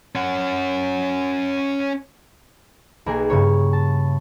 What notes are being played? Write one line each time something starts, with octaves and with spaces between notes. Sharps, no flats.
C#4 F#5
B1 B2 A#3 G#4
G2 C#3 C#5
A5